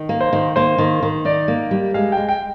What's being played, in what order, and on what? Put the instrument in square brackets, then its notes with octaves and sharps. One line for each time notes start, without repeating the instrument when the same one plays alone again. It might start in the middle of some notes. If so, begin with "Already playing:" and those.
Already playing: [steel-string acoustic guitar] D#3
A#3
[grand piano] C5
[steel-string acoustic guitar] D#3
[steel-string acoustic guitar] A#3 [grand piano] C5
[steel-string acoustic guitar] D#3
D#3
[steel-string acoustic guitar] D#4 [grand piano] D5
[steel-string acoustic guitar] A#3
G3
[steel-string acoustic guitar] G#3 [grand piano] F5
[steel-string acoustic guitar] G#3 [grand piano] G5
[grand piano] G5